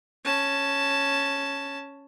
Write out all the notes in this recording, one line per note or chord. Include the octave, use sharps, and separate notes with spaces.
C#4 A5